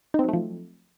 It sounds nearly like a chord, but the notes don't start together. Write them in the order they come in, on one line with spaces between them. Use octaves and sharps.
D#4 C4 F#3 A3 F3